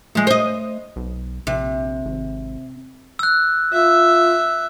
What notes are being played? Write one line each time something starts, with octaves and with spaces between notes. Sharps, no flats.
F3 G#3 A3
C5 D#5
B1
A#1 C3
G#1
E6 F#6
F4 E5